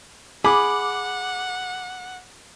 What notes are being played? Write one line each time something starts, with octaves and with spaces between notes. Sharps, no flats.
G#4 F#5 B5 D6